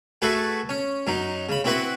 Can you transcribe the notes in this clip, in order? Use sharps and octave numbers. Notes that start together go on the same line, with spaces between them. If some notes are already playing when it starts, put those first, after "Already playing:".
A3 F#4 G#4 A4 B4
C#4
F#2 F#3 D#4
C#3 B5
C4 E4 F#4 B4 F#5 B5